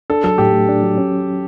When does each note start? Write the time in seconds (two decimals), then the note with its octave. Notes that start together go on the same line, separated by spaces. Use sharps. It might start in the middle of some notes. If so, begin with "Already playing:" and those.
0.10 D4 A4
0.24 F#3 A4
0.38 A2 G4
0.53 A3
0.69 D4
0.83 F#3
0.98 C#4